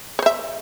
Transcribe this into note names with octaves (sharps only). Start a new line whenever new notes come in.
C5 C#5 E5